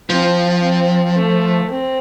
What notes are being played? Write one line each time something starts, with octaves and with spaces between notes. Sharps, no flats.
F3 C4
C4
A3
C4